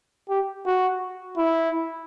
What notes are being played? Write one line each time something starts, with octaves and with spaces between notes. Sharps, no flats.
G4
F#4
E4